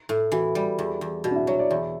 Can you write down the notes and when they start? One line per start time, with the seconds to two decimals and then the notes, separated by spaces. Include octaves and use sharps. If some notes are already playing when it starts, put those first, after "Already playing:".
0.09 A2
0.32 E3 F#4
0.55 G3
0.79 E2
1.01 E2
1.24 B2 F#4
1.31 D4
1.35 E4
1.47 F#3 C#5
1.59 D5
1.71 E2 E5